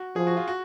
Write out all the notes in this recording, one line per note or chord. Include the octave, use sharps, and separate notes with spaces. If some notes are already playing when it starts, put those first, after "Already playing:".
Already playing: F#4
F3 G#4
F#4
F4
F#4